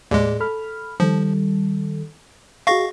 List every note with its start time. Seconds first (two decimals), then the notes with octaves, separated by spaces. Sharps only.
0.11 D#2 A2 G#3 G#4 D5
0.40 A4 B5 F6
1.00 D#3 F3 G3 A4
2.67 F#4 G#4 D#5 F5 C#6 A#6